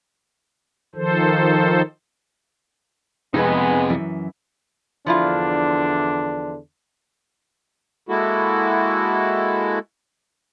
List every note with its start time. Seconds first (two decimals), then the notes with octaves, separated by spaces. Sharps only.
0.95 D#3 F3 A4 C5
3.34 F2 C3 G#3 B3 D#4 G#4 B4
3.90 F#2 E3
5.06 E2 D3 F3 D4 E4 F4
8.09 G#3 A#3 E4 F#4 A4